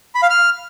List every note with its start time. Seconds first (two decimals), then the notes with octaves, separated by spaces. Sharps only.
0.15 B5
0.22 F5
0.30 F6